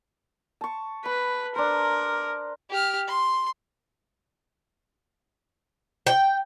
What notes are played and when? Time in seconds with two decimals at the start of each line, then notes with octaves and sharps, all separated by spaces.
0.61 A5 C#6
1.06 B4 B5
1.56 D4 A#4 C5
2.71 G4 F6
3.08 C6
6.07 G5